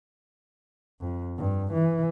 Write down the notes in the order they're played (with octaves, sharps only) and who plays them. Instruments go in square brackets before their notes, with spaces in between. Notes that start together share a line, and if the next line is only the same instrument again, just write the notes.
[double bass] F2
G2
E3